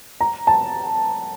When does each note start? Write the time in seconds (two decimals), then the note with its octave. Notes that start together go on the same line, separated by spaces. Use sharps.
0.21 A#5
0.47 A5